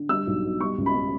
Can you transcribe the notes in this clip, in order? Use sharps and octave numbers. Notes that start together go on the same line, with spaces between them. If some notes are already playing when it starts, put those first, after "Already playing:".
Already playing: D3
G3 E6
B1
B2
G3 C#6
C#2
B5
C#3